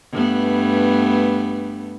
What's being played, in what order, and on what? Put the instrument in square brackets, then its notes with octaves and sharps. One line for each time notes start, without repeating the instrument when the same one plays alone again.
[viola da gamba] G2 A3 B3